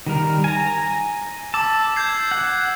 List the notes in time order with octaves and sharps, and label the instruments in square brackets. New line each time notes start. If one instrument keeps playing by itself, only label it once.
[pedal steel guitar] D#3 G3 A#4
G#5 A#5
[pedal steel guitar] A5 [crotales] D6 E6
[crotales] G6 G#6 C7
[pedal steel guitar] F#5